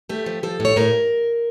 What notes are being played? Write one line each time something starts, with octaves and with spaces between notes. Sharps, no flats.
A3 G4
F3
F3 A4
A2
C#5
A2 A#4